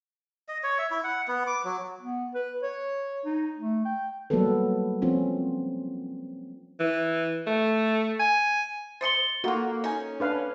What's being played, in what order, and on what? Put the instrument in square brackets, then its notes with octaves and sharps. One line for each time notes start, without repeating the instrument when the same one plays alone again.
[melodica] D#5
C#5
E5
E4
F#5
B3
D6
F#3
[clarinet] B3
B4
C#5
D#4
A3
G5
[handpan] F#3 G3 A#3 B3 A4 B4
F3 C4 C#4 F4
[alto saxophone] E3
A3
G#5
[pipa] C5 D#5 C6 [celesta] A6 C#7 G7
[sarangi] A#3 [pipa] D#4 F4 [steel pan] F#4 [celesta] A4
[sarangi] C#4 [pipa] D#4 G#5
[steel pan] D4 B4 F5